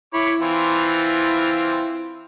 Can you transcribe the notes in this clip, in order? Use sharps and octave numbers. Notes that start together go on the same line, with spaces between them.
E4 C#5 B5 D6
E3 C4 F4